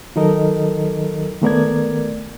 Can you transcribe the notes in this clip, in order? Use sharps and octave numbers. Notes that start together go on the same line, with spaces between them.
D#3 F#3 D#4 A4 A#4 D#5
D#3 A3 B3 A#4 D5 G#6